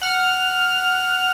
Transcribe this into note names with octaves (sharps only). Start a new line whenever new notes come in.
F#5 F6